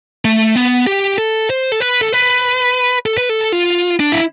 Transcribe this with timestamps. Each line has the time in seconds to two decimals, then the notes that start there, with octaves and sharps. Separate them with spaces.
0.25 A3
0.56 B3
0.87 G4
1.18 A4
1.50 C5
1.72 A4
1.80 B4
2.01 A4
2.13 B4
3.06 A4
3.18 B4
3.29 A4
3.52 F4
4.00 D4
4.12 E4